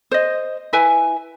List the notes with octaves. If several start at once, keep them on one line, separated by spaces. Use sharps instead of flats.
C5 D#5
E4 B4 E5 G#5